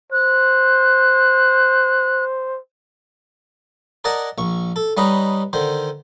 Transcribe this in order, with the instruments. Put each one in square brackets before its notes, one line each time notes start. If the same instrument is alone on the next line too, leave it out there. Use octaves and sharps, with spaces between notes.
[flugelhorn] C5 [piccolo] F#6
[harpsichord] A#4 D5 D#5 F#5 G#5 A5
A#1 C#6
A4
G3 C#4 D#4 B4 D#5
D3 D#3 C5